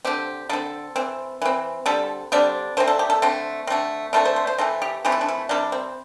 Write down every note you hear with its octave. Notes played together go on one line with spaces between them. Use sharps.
D3 C4 G4
D3 C4 A4
E3 C4
E3 C4
D3 G3 C4 A4
D3 G3 C4 D4
D3 A3 C4 C5
A4
G4
A4
D3 A3 C4
D3 A3 C4
D3 A3 C4 A4
C5
C5
C5
E3 A3 C4 A4
G4
E3 A3 C4 G4
E4
D4
E4
C3 G3 C4 D4
C4